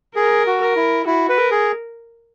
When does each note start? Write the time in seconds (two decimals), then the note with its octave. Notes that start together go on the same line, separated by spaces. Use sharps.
0.15 G#4 A#4
0.47 F#4
0.61 A#4
0.76 E4
1.06 E4 F#4
1.29 B4
1.37 A#4
1.51 G#4